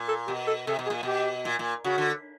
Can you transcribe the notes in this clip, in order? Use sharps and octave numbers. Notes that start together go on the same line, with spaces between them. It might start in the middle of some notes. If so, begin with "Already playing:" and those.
Already playing: A#2
A4
B2 G4
A4
C3 A4
B2
G#4
A#2
B2 G4
A#2
A#2
C#3 F#4
D3